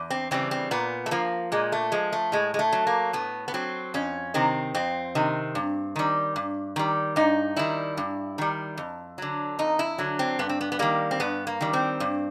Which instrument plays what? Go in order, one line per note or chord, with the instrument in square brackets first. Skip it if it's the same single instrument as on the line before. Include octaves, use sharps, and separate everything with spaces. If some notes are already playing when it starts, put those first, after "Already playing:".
Already playing: [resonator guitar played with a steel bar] E2
C4
C#3 E3 G3 C4
C4
A#2 B3
A3
F3 A#3
A#2 G#3
A3
F3 G#3
A3
A2 G#3
G#3
A3
F#3
A#3
A2 B3
B3
F#3 C4
F2 C#4
C3 D#3 C4
F2 C4
C3 D#3
G2
D#3 G3
G2
D#3 G3
G2 D#4
D#3 G3 E4
G2
D#3 G3
F2
D3 F#3
F2 D#4
E4
D3 F#3
C4
G2 B3
C4
B3
B3
D#3 G3 A#3
C4
G2 B3
A#3
D#3 G3
C4
G2